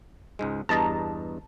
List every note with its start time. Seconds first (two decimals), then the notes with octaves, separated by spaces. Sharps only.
0.39 C#2 G#2 G#3
0.69 E2 G2 D#5 A5 A#5